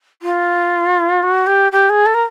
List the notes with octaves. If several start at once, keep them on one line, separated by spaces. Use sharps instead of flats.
F4
F#4
G4
G4
G#4
A4
A#4